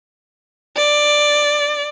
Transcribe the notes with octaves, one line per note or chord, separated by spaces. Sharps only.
D5